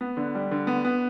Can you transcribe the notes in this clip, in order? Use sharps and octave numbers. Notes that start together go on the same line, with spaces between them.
B3
D3
G3
D3
B3
B3